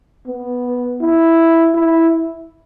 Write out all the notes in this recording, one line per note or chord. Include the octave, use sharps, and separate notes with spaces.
B3
E4
E4